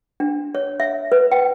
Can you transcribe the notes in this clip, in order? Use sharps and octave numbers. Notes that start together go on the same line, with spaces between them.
D4
C#5
E5
B4
G5